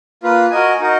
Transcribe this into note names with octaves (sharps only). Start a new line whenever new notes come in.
A#3 F4 B4
F#4 A#4 D#5 G#5
D#4 F#4 A#4 D#5